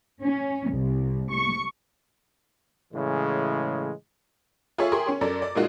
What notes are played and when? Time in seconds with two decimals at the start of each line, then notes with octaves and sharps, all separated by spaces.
0.22 C#4
0.71 C2
1.32 C#6
2.93 A2 C#3 E3 G#3
4.78 F4 G#4 A4 C#5 E5 C#6
4.92 G4 G#4 A#4 C6
5.07 C#4 C#5
5.21 F#2 A4 A#4 D5
5.42 D5
5.55 A#2 G#3 A#3 D#4 F4 F#4